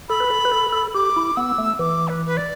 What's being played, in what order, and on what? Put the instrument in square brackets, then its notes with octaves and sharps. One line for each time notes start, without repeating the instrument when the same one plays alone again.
[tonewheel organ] A4 [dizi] B5
[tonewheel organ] B4
A4
B4
A4
A4
[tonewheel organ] G4 [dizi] D6
[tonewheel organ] E4
[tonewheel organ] B3 [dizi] E6
[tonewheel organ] A3
[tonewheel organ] E3 [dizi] D6
[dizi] B4
B4
D5